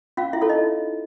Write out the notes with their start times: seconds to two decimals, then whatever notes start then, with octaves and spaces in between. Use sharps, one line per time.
0.17 C#4 F4 F5
0.33 E4 E5
0.41 F4 A4 C#5
0.49 D#4 D#5